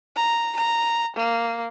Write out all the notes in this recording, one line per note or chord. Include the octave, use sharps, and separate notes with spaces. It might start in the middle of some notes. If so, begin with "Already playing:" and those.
A#5
A#5
A#3